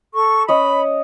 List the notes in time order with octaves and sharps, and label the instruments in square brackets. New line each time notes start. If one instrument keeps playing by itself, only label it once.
[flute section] A4 C#6
[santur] C#4 C#5 D#5 [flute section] B5